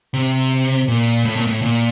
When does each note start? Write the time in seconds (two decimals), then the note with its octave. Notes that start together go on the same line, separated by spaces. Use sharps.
0.14 C3
0.88 A#2
1.25 A2
1.36 A#2
1.47 A2
1.62 A#2